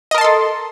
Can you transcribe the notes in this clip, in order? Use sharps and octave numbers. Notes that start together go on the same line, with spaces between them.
A4 A#4 D#5 A5 C6